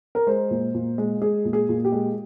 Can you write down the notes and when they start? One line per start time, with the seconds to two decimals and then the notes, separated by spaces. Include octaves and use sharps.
0.15 A#4
0.27 G#3 C5
0.51 A#2
0.74 A#2
0.98 G#3
1.22 G#3 G#4
1.45 A#2
1.53 G#4
1.69 A#2
1.85 G4
1.92 G#3